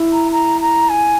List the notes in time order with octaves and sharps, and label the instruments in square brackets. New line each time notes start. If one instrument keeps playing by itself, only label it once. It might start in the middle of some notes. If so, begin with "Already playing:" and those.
Already playing: [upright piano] E4
[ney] A#5
A#5
A#5
G#5